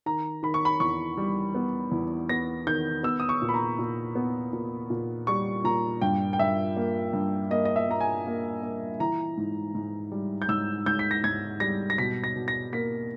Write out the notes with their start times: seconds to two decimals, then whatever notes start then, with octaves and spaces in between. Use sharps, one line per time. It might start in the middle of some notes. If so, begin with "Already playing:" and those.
0.06 D#3 A#5
0.43 D#3 B5
0.54 C#6
0.65 B5
0.80 E2 C#6
1.18 G3
1.55 B3
1.92 E2
2.29 B3 A#6
2.67 D#3 G6
3.03 B3 E6
3.20 D#6
3.29 C#6
3.42 A#2
3.49 B5
3.54 A#5
3.79 A#2
4.15 B3
4.53 A#2
4.90 A#2
5.27 G3 C#6
5.64 A#2 A#5
6.01 G2 G5
6.33 G5
6.39 G2 E5
6.76 A#3
7.13 G2
7.51 A#3 D#5
7.65 D#5
7.76 E5
7.89 A#3 A#5
8.01 G#5
8.26 A#3
8.62 A#3
9.00 E3 A#5
9.37 G#2
9.75 G#2
10.12 G3
10.42 G6
10.49 G#2 E6
10.86 G#2 G6
10.99 B6
11.11 A#6
11.24 G#2 G#6
11.60 G3 A#6
11.90 A#6
11.98 B2 B6
12.24 A#6
12.36 B2
12.48 A#6
12.73 A#3 B6